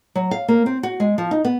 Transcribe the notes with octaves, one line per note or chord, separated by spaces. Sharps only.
F#3
F5
A#3
C4
F#4
G#3
F3
D#4
B3